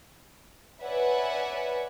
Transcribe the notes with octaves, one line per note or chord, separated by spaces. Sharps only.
B4 C#5 D5 E5 F#5 G#5